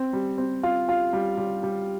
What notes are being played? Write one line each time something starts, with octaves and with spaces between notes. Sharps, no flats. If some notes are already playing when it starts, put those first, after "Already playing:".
Already playing: C4
G3
C4
F4
F4
G3
G3
G3